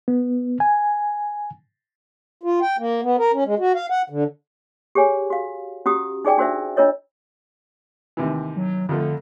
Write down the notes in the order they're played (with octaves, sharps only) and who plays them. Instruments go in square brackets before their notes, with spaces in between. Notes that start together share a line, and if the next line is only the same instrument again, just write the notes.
[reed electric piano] B3
G#5
[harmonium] F4
G5
A#3
B3
A#4
C#4
G#3
F#4
F5
F#5
D3
[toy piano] G4 G#4 C#5 G#5
F#4 F5
C#4 F#4 G4 A#5 D#6
D#4 G#4 D5 G5 G#5
D4 F#4 A#4 C5 D5 E5
D4 F4 A#4 C#5 D#5
[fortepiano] D#2 C3 E3
[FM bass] F#3
[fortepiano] F2 F3 A3 [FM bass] D3